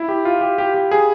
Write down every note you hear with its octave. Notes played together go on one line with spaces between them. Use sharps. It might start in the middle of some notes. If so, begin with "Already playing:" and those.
Already playing: E4
G4
F4
G4
G4
G4
G#4